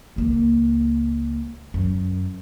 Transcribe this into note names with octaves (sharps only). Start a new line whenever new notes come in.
C#2 A#3
F#2